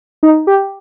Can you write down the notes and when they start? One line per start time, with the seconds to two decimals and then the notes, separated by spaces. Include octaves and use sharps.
0.23 D#4
0.47 G4